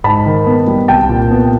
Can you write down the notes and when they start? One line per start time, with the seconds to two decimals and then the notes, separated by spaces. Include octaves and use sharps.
0.04 G#2 A5 B5
0.26 D#3
0.46 B3
0.67 G3
0.88 C2 G5 A5
1.09 A#2
1.31 B3